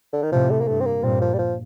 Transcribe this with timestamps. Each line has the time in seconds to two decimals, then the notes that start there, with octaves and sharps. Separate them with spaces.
0.13 D3
0.22 D#3
0.32 A2 C3 F3
0.50 A3
0.61 A#3
0.68 G2 A3
0.81 C4
0.86 A#3
1.03 G2 A#2 C4
1.21 F3
1.33 G3
1.38 F3